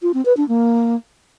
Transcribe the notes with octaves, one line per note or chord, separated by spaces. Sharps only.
F4
C4
B4
D4
A#3